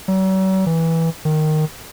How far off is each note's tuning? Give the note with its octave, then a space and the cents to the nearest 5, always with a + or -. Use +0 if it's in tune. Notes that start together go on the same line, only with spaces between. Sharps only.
F#3 +45
E3 -10
D#3 -10